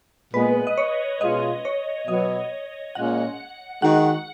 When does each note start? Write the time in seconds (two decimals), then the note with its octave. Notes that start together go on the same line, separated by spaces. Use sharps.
0.33 A#2 G#3 B3 B4
0.67 D#5
0.78 C#5
1.21 B2 G#3 C#4 F4 D#5
1.65 C#5
2.08 B2 F#3 B3 D#5
2.95 A#2 G#3 C#4 F4 F#5
3.82 D#3 G#3 D#4 F#4 F#5